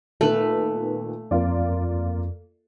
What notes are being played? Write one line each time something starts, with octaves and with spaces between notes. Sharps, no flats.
A#2 D#3 A3 B3 B4
F2 A#3 F4 D5